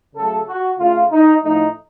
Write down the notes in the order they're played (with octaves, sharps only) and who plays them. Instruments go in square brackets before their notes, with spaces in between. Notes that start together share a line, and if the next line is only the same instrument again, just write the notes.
[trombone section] C#3 F#3 A3 A4
F#4
C#3 A3 F4
D#4
A2 F3 A3 D#4